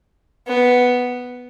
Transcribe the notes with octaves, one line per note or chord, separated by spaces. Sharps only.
B3